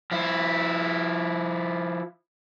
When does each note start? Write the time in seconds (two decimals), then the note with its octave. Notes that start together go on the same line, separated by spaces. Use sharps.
0.12 F3 E4